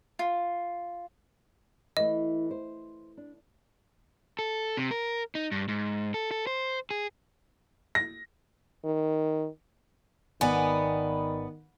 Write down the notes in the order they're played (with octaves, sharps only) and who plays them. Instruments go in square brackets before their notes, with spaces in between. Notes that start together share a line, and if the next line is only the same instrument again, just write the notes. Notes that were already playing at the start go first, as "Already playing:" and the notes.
[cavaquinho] F4
[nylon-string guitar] E3 A3 [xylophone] D#5
[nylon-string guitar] C5
D4
[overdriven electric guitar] A4
C3
A#4
D#4
G2
G#2
A4
A4
C5
G#4
[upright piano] A#6
[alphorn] D#3
[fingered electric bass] G#1 [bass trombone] D#3 [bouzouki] B3 [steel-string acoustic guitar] D5 G#5